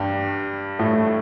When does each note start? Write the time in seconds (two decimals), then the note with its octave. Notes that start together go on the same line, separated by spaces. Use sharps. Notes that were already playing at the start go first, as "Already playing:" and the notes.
Already playing: G2 G3
0.79 A2 A3